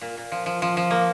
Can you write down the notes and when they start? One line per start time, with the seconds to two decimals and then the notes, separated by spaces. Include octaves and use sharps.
0.01 A#2
0.18 A#2
0.32 F3
0.46 F3
0.62 F3
0.77 F3
0.91 A#3